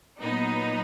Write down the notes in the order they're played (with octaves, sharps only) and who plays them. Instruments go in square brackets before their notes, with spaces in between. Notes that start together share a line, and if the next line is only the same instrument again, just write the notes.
[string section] A#2 F#3 B3 D#4